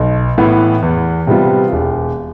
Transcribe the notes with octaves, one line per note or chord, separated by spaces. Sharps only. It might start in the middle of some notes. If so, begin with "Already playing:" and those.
Already playing: B1
A2 E3 B3
E2
C3 G3 B3 F4
E1